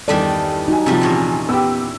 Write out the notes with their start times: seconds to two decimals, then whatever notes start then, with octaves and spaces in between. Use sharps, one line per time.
0.08 E2 G2 D#3 G3 D4 A4 D5
0.68 F#3 D#4 G#5
0.86 C3 F3 G3 A3
1.01 E2 A#2 C#4
1.49 B3 G4 E6